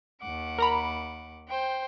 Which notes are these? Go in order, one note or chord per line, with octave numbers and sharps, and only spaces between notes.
D#2 F#5 D6
A#4 A#5 B5
C5 G5